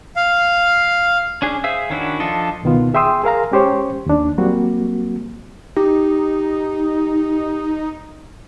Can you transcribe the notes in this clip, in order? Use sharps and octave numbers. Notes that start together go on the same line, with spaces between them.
F5
C#4 D4 G#4
G#4 C5 E5 F5 E6
D#3 C#4 D4 E4 F#4
F3 D4 F4 A4 D#5
C#2 B2 D#3 B3 F4
G#4 E5 G5 C6 D#6 E6
G#4 A#4 F5 A#5
G#3 C#4 G4 C5 C#5
D#2 D4
F#3 G3 A#3 C4 F#4
D#4 G4